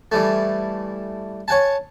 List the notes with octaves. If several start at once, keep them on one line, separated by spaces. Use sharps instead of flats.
E3 G3 A3
C#5 F#5 G#5 A5